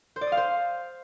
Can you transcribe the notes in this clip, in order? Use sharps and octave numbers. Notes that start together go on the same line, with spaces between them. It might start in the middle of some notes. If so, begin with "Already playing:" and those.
C5
D5
D#6
F5
C5